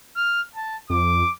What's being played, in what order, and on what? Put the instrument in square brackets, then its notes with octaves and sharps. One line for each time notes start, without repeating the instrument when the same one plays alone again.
[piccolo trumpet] F6
A5
[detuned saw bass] F2 [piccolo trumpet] D6